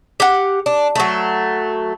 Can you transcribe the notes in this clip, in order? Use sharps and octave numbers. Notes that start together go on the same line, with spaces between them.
G4 F#5
D4
F#3 A3